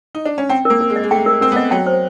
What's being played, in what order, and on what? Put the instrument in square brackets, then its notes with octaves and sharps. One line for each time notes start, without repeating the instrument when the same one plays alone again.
[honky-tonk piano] D#4
D4
C#4
[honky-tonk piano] C4 [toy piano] G5
[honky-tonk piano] A#3 [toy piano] A#4
[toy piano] A#4
[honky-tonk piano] G#3
[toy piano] D#5
[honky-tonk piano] G#3
[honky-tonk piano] A3 [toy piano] G5
[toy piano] A#4
[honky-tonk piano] C4 [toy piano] A#4
[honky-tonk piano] B3
[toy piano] D#5
[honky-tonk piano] F#3 [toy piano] G5
[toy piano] C5